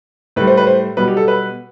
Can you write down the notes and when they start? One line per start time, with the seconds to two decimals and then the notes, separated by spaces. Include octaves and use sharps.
0.36 A2 B4
0.40 G3
0.47 C5
0.57 B4
0.67 C5
0.97 B2 G3 B4
1.08 G4
1.17 A4
1.28 B4